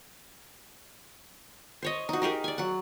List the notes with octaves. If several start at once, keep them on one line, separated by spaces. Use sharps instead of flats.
C5 C#5 D#5
D#4 F#4
D#4 G4 G#4 A#4
D5 G#5
F#3 F#5